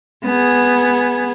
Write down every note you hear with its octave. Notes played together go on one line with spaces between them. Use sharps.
B3 G#4